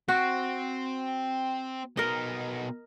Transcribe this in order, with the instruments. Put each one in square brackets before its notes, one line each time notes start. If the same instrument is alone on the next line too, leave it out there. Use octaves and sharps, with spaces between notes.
[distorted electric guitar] C4 [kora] F#4
[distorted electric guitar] B2 D#4 [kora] A#4 D#5